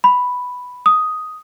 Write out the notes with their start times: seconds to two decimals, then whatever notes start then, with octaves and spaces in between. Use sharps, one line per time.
0.04 B5
0.86 D#6